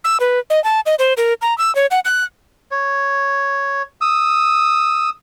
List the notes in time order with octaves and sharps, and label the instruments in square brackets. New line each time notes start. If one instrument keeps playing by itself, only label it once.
[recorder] E6
B4
D#5
A5
D#5
C5
A#4
A#5
E6
C#5
F#5
F#6
[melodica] C#5
D#6 E6